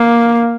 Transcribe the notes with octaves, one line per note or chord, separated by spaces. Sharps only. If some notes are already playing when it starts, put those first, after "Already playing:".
Already playing: A#3